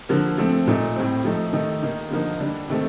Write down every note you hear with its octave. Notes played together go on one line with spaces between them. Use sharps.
D3 F3 A#3
F3 A3 C4
A#2 A3 D#4
A2 G3 C4
F3 A3 D#4
D#3 A3 D#4
D#3 A#3 D#4
D3 F3 A#3 D#4
D3 G3 D4
C3 D#3 A3 C4